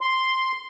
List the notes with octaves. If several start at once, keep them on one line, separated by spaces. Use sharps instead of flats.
C6